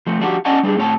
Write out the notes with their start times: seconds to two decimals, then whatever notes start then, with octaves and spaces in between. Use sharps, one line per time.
0.07 F3 A3
0.20 F3 D4 F#4 G4
0.45 C#4 D5 D#5 F#5 G#5 A5
0.63 G3 D4 G#4
0.77 A2 C4 C#5 A5